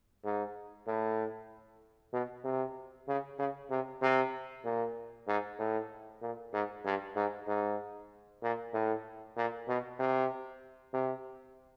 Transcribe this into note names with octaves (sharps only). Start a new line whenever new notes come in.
G#2
A2
B2
C3
C#3
C#3
C3
C3
A#2
G#2
A2
A#2
G#2
G2
G#2
G#2
A#2
A2
A#2
B2
C3
C3